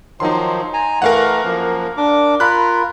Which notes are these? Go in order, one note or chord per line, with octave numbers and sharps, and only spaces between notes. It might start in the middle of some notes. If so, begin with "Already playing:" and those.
D#3 F3 F#3 D#4 C6
G#5 A#5
E3 A3 A#4 F5 F#5
F#2 F3 A#3
D4 D6
F4 A#4 B5 F#6